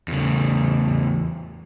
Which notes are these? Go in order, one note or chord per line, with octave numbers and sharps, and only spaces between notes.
E2 C#3